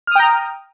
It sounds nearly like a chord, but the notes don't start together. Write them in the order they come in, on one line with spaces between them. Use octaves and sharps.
F6 D#6 G5 A#5